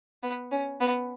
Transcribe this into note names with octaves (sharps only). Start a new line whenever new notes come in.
B3
C#4
B3